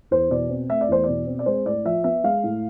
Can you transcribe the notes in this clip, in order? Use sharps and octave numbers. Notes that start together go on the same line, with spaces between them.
E2 C5
B2 D5
C4
A3 E5
D5
E2 C5
B2 D5
C4
D5
G#3 C5
A2 D5
F3 E5
B3 E5
G#3 F5
A2